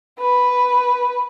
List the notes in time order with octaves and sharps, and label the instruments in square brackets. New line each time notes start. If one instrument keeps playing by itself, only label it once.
[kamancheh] B4